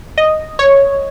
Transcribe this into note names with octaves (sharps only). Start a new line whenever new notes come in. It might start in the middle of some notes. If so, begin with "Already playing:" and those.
D#5
C#5